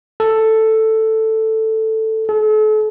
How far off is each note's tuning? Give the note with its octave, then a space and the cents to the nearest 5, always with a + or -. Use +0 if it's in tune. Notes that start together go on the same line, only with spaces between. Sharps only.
A4 +5
A4 -40